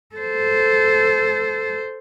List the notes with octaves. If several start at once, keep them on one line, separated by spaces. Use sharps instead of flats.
A4 C5